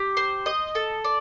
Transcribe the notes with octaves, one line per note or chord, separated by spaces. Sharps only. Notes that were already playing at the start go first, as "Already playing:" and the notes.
Already playing: G4
C5
D#5
A4
D5